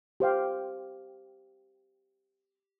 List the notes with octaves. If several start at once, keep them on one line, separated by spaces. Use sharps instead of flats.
G4 C5 F5 G5